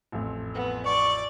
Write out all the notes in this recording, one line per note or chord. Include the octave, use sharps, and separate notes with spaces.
A1 F2 A3
B3
D5 C#6